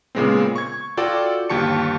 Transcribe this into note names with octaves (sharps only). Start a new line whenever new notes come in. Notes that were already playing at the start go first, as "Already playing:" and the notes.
A#2 C#3 G#3 B3 C4
C#6 G#6
F4 F#4 A4 D5 G5 D6
G1 D#2 G4 A5 C#6 C#7